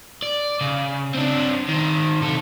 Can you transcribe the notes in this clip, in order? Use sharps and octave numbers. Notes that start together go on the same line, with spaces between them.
D5
C#3
C4 D4
D#3 C5
C3 A4